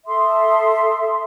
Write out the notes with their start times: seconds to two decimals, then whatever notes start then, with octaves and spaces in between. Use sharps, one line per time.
0.06 A4 E5 C6 D#6